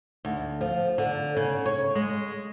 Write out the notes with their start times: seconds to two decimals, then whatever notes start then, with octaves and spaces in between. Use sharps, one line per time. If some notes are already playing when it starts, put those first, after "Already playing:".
0.25 D2
0.61 F3
0.98 D3
1.37 C#3
1.66 C#5
1.95 G#3